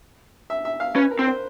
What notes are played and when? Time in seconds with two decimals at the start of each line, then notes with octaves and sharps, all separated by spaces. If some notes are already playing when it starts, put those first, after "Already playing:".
0.50 E5
0.65 E5
0.80 F5
0.96 C#4 B4
1.11 A#4
1.19 C4
1.27 C5